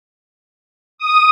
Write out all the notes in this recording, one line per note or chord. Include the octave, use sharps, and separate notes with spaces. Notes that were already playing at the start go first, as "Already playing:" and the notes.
D#6